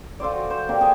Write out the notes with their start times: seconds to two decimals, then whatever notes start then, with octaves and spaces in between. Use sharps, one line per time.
0.20 F4 A4 C5 D5
0.32 F#4 A4
0.50 C5
0.69 A#3 C4 D4 G4
0.81 G#4 A#4 G#5 A5